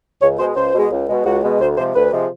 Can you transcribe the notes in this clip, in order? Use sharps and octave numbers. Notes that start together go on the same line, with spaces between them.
C#2 C#5
B2 G#3 C5
C#2 C5
B2 G#3
C#2
B2 G#3
C#2 F#4
B2 G#3
D2 C5
C3 F3 G#3 C5
D2 B4
C3 F3 G#3